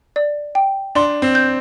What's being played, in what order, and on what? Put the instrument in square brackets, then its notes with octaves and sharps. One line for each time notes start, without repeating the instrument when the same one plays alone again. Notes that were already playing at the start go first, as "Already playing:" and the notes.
[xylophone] D5
G5
[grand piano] D4 [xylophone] C6
[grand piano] C4
[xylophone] G6